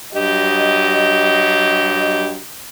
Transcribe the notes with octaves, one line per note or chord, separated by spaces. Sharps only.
G2 F#3 G4 D#5